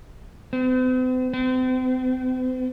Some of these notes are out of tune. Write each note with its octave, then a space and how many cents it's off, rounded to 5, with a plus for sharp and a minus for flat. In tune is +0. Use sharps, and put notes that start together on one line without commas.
C4 -45
C4 -40